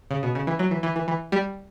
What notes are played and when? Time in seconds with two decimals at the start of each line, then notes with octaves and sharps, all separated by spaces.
0.11 C#3
0.23 B2
0.35 C#3
0.47 E3
0.59 F#3
0.71 E3
0.83 E3
0.96 E3
1.08 E3
1.32 G3